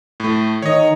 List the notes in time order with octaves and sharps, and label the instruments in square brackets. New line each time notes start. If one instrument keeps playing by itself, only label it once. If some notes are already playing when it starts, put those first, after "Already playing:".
[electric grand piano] A2 A3
[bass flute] D#3 [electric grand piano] C#5 D#5